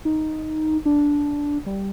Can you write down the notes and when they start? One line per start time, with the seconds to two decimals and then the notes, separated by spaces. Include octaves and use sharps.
0.05 D#4
0.85 D4
1.66 G3